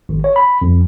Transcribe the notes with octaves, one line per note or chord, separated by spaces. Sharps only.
G#1
C#5
B5
F2